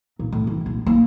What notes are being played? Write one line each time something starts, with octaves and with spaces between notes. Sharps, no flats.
A#2
A2
E3
A#1
A#3